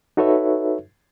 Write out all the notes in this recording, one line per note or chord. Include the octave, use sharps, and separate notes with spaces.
D#4 F#4 A4 B4 C#5 E5